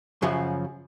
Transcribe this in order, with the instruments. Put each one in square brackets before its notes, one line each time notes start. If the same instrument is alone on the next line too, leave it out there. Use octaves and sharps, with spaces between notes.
[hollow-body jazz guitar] F#2 C#3 F3 F#3